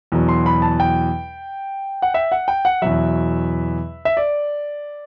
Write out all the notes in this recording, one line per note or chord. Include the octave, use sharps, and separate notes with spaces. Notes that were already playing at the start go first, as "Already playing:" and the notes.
E2 B2 F#3
C6
B5
A5
G5
F#5
E5
F#5
G5
F#5
E2 B2 F#3 E5
E5
D5